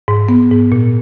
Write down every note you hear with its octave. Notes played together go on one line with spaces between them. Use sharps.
G#2
B3
G#2
A#2